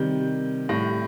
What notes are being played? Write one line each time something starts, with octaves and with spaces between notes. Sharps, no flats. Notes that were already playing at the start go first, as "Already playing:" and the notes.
Already playing: C3 D#3 G3 G6
A2 G3 A#6